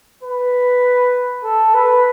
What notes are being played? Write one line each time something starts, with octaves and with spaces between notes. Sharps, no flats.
B4
A4
B4